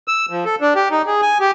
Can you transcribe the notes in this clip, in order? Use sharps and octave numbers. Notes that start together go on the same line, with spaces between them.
E6
F3
A4
D4
G4
D#4
G#4
G#5
G4